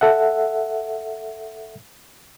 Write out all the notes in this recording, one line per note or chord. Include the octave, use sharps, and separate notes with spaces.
A4 E5 F#5